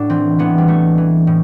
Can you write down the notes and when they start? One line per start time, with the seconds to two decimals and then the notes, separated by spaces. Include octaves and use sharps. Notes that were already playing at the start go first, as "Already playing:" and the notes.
Already playing: A2 D4 F#4
0.10 E3 C4
0.39 E3 B3
0.58 G3
0.68 E3 A3
0.98 E3
1.27 A2